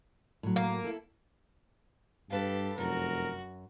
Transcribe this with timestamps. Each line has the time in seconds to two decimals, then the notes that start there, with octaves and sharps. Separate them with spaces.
0.43 A2 F#3
0.56 A#3
0.84 E4 A4
2.30 G2 G4 A4 B4 F5 A5
2.78 F1 F#2 F#4 A#4